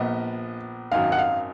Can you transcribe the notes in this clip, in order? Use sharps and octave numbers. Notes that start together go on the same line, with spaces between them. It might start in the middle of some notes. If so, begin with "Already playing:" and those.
Already playing: A#1 A#2 F3 B3 D#5
G#1 F#2 D#3 F#3 F5
F#5
F5